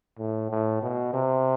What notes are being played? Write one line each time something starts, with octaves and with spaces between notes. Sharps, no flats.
A2
A2
B2
C3